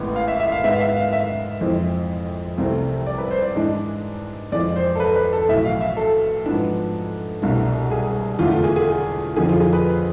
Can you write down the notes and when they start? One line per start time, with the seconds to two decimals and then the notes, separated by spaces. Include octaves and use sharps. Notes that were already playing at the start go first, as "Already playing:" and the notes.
Already playing: A1 A2 G#3 B3
0.16 F5
0.28 E5
0.40 E5
0.52 F5
0.63 G#2 G#3 B3 E5
0.75 F5
0.80 E5
0.96 F5
1.13 E5
1.61 F2 E3 G#3 C4
2.58 C2 C3 E3 A3 C4
3.06 D5
3.18 B4
3.31 C5
3.42 D5
3.55 G#2 E3 G#3 D4
4.52 F2 E3 G#3 D5
4.76 C5
4.95 A4
5.00 B4
5.16 B4
5.33 A4
5.49 B1 A2 E3 E5
5.65 F5
5.81 E5
5.97 A4
6.46 G#2 F3 B3 D4
7.42 C2 B2 A3 D4
7.91 G#4
8.39 E2 D3 A3 F4
8.51 F4
8.64 G#4
8.76 G#4
9.36 F2 D3 F3 G#4
9.49 F4
9.60 G#4
9.73 B4